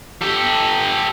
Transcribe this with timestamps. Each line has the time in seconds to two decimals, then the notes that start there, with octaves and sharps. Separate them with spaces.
0.21 G4 A4